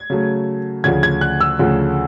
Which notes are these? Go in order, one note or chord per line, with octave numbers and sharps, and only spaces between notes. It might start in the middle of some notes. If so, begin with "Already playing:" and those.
Already playing: G#6
C#3 F#3 A3
D2 C#3 F3 A3 G#6
G#6
F#6
E6
D2 C#3 F3 A3